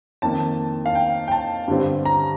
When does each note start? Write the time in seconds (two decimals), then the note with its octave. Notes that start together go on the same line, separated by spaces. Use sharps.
0.22 F2 D#3 A#3 A5
0.86 F5
0.95 G5
1.28 G5
1.31 A5
1.68 G2 D3 G3 C4
2.05 A#5